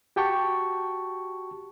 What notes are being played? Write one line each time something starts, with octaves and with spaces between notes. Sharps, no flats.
F#4 G4 G5 A5 C#6